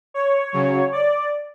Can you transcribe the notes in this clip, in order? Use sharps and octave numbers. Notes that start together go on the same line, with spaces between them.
C#5
C#3 F#3
D5